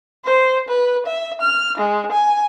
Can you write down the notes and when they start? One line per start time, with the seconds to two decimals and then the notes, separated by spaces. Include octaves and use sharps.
0.24 C5
0.68 B4
1.06 E5
1.41 F6
1.77 G#3
2.11 G#5